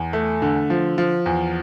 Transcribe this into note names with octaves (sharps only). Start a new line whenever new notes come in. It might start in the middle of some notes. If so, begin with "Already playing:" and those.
Already playing: E2
A3
D3
F3
F3
E2